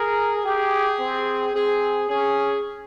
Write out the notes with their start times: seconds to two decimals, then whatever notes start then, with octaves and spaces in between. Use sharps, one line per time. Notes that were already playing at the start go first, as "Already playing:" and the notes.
Already playing: G#4 A#4
0.45 G4 G#4
1.00 C4
1.54 C4 G#4
2.09 C#4 G#4